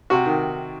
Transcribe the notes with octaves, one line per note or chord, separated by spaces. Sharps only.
C3 F#4
D#3